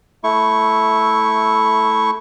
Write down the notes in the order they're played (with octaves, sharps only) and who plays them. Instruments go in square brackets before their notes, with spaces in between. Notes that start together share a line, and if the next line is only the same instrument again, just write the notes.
[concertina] A3 E4 C#6